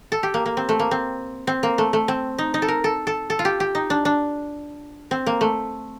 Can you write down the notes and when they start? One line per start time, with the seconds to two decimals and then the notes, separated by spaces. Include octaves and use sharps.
0.12 A4
0.23 G4
0.34 A#3
0.46 A#3
0.57 C4
0.69 A3
0.79 A#3
0.91 C4
1.47 C4
1.63 A#3
1.78 A3
1.93 A3
2.08 C4
2.38 D#4
2.54 D#4
2.62 A4
2.68 A#4
2.84 A4
3.07 A4
3.30 A4
3.39 F4
3.45 G4
3.60 G4
3.75 D#4
3.90 D4
4.05 D4
5.11 C4
5.26 A#3
5.41 A3